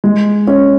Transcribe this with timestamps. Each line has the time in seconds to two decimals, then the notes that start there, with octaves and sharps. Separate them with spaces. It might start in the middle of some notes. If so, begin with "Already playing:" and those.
0.04 G#3
0.48 C#4